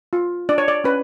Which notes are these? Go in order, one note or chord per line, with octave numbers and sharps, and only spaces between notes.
F4
D4 D5
C#5
D5
C#4 B4